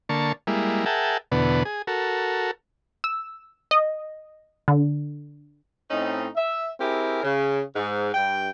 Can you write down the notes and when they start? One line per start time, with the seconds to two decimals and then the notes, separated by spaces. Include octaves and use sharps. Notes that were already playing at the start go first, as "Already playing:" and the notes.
0.09 D3 A#3 A5 C#6
0.47 G3 G#3 A#3 E4
0.86 G#4 A#4 E5 F#5 G5 A5
1.32 E2 B2 D3 B3
1.65 G#4
1.87 F#4 A4 A#4
3.04 E6
3.71 D#5
4.68 D3
5.90 A2 C4 C#4 D#4
6.36 E5
6.80 C4 E4 G4 G#4 A#4
7.23 C#3
7.75 G#2
8.14 G2 G5